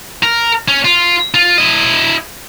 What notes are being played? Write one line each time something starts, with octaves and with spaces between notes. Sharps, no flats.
A#4
C#4
F4
F4
E4 D#5